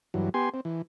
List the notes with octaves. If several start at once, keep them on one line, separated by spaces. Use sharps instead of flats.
G2 E3 F#3
B3 G4 G#5 C6
C4
E3